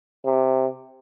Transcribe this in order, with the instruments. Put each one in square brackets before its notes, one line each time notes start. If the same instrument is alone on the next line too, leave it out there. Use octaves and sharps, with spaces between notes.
[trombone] C3